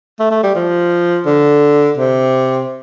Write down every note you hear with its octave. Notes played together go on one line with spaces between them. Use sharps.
A3
A3
G3
F3
D3
C3